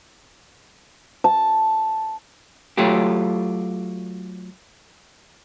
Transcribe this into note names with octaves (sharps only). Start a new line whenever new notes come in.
A5
F#3 A3 F4 G4